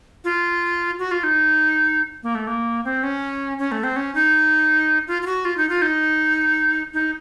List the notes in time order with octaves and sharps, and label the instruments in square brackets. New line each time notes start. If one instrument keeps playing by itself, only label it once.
[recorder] F4
F#4
F4
D#4
A#3
A3
A#3
C4
C#4
C#4
A3
C4
C#4
D#4
F4
F4
F#4
F4
D#4
F4
D#4
D#4